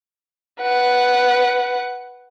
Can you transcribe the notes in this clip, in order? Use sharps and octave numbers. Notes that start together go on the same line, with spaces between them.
B4 F#5